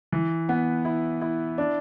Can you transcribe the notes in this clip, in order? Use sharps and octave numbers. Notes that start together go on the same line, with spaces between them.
E3
B3
E4
E4
D4